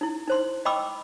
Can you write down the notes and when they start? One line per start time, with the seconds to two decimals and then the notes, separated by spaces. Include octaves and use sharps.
0.01 D#4 E4
0.27 D#4 C5 C6
0.65 D#5 G5 B5 C#6 D6 E6